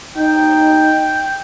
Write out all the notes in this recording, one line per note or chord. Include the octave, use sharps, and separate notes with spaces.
D#4 G5